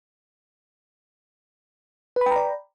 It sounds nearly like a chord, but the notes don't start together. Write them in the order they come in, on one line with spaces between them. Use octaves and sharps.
B4 B5 G5 A#5 D5